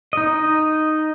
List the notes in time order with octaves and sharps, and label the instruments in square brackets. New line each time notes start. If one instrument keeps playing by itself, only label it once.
[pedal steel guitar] D#4 D#5